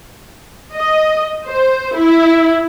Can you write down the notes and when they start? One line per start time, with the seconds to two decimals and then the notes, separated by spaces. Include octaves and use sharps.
0.74 D#5
1.47 C5
1.96 E4